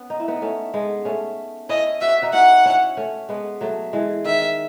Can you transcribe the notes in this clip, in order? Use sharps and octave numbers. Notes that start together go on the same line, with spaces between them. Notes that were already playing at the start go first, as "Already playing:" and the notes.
Already playing: B3 C#4
D#4
E4
B3 D#4
A3 C#4
G#3 B3
A3 C#4
C#4 E4 D#5
F#4 E5
D#4 F#4
D#4 F#4 F#5
C#4 E4
A3 C#4
G#3 B3
F#3 A3
E3 G#3
D#3 E5